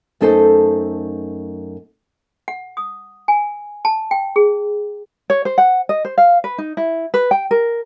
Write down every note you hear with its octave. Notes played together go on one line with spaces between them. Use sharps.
F#2 A3 D#4 A4 C5 A5
F#5
D#6
G#5
A5
G5
G#4
C#5
C5
F#5
D#5
C5
F5
B4
D#4
E4
B4
G5
A#4